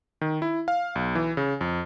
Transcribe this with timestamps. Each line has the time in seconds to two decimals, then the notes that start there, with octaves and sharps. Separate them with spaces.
0.21 D#3
0.42 E4
0.68 F5
0.95 B1
1.15 E3
1.37 C#3
1.61 F2